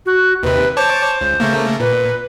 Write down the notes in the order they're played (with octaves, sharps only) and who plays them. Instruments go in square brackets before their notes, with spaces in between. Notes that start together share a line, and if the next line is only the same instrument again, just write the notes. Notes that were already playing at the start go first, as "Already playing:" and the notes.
[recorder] F#4
[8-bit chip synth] D#2 C3 [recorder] B4
[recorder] C5 [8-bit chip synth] C#5 A5 D6
[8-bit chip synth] C#2
C#3 A3 A#3
[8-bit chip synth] A#2 [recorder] B4